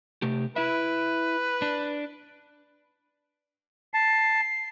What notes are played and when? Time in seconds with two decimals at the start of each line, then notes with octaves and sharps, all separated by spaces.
0.22 C3 A3 G4
0.56 E4 B4 E5
1.62 D4
3.94 A5 C7